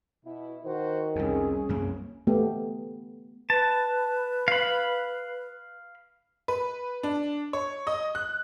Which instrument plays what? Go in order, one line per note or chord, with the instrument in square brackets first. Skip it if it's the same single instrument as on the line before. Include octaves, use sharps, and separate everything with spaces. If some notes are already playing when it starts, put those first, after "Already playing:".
[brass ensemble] B2 E4
[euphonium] D#3 [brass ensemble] F#4 C5
[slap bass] C2 F2 [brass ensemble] C#4 [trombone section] G#4
[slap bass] C2 F#2 A#3
[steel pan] A3 B3 G4
[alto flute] B4 [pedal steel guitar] A5
[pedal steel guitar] F5 B5
[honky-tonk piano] B4
D4
C#5
D#5
F#6